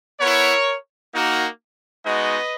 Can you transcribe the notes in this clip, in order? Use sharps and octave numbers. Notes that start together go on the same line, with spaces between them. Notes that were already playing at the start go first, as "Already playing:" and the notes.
B3 E4 A#4 C#5
A#3 D#4 F#4
G#3 B3 D#4 F#4 B4 D#5